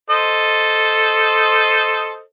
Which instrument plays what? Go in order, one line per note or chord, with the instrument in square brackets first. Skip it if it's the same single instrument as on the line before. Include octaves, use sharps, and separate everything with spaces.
[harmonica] A4 C5 D#5